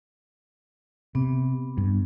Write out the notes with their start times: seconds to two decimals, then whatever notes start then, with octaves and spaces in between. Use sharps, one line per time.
1.15 C3 B3
1.77 G2